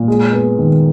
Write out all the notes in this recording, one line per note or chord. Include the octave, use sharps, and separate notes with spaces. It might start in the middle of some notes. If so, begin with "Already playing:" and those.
Already playing: A#2
G#3
B3
D#3